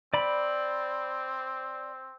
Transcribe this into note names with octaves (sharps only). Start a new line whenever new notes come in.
C4 D5 B5